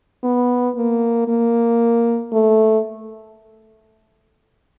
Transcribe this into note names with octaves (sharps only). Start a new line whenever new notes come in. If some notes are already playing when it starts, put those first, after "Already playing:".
B3
A#3
A#3
A3